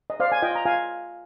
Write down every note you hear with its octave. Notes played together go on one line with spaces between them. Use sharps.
D#5
C5 D5 F5
G#5
F4 D#5 G5
A#5
F4 F5 G#5